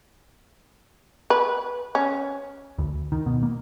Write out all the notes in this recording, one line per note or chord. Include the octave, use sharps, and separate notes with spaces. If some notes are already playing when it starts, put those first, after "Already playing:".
B4
C#4
D2
D#3
B2
A#3